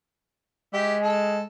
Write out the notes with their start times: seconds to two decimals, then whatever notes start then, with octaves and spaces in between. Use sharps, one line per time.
0.74 G#3 G4 E5
1.02 A4